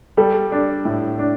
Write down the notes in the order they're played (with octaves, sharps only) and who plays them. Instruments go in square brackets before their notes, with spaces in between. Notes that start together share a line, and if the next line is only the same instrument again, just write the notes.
[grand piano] G3 [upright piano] A4
[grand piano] D4
A2
D4